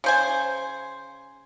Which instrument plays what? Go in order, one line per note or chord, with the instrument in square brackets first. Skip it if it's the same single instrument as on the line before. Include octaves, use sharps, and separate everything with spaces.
[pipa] C#3 C5 G#5